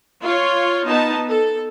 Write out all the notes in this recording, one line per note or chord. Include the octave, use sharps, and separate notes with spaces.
F4 C#5
B3 D#4 A5
A4